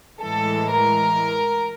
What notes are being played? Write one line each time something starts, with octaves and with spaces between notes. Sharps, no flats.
A2 E3 G#3 A4
A#4